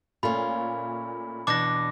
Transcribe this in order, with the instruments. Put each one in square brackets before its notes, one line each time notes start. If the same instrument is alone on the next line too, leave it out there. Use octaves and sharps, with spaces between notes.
[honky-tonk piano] A#2 A3 [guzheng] C#4 F4 [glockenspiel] B5
[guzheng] E2 B2 D4 [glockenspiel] D6 A#6